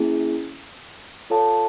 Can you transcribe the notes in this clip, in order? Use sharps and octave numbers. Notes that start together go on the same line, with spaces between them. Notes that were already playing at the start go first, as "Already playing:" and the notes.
Already playing: A#3 C#4 E4 G#4
F4 A4 C#5 F5 A5